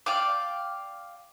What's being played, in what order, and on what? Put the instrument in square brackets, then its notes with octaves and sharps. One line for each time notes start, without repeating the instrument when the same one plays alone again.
[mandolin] D5 F5 G5 D6